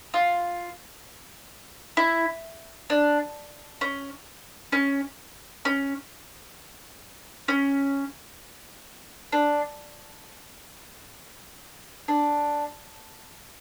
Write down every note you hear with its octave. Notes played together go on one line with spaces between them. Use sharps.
F4
E4
D4
C#4
C#4
C#4
C#4
D4
D4